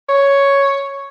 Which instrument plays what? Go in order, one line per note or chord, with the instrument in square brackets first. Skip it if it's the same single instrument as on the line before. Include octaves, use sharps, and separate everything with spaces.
[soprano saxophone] C#5